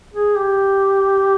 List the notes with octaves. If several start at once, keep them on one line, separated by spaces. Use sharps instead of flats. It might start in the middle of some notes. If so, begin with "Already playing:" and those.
G#4
G4